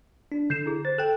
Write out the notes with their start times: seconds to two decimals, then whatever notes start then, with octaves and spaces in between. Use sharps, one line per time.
0.32 D4
0.50 D3 G6 C7 E7
0.66 E4 G#4
0.85 C5 A6
0.98 A4 G5 F#6 E7